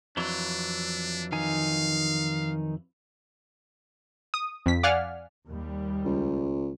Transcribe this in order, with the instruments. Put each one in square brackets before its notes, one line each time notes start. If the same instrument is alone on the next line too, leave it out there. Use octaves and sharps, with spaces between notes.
[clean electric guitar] F2 E3 F#3 [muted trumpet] D4
[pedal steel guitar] D#3 D#4 G#5 [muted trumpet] F5
[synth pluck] D#6
F2 B6
D5 F5 F#5 G#5 F6
[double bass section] D#2 G3
[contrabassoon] C#2